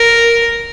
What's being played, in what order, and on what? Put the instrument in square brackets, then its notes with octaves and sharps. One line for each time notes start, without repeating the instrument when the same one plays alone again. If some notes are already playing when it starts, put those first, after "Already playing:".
Already playing: [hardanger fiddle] A#4